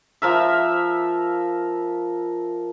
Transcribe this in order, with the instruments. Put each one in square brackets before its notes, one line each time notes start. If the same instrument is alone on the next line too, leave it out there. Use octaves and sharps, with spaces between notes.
[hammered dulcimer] F3 A#4 E5